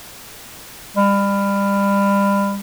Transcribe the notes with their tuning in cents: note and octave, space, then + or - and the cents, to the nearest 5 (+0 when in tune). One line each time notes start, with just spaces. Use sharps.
G3 +30